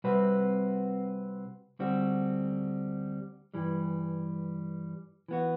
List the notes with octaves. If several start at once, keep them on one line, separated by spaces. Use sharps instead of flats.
C3 G3 C4 F#4 B4
D2 D3 G3 C4 F#4
G2 E3 G3
E3 B3 F#4